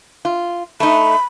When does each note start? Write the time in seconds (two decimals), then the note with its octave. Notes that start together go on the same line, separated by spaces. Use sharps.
0.25 F4
0.80 A3 D#4 B5